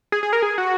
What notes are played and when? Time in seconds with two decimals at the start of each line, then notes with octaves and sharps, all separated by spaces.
0.12 G#4
0.23 G#4
0.33 A#4
0.42 G#4
0.58 F#4